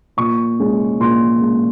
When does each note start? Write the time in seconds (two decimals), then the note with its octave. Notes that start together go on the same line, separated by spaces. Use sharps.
0.17 A#2 C#6
0.60 G#3 C#4
1.00 A#2 C6
1.41 G#3 C#4